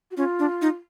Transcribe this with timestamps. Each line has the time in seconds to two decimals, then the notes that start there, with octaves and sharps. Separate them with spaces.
0.11 F#4
0.17 C#4 F4
0.39 D4
0.62 D#4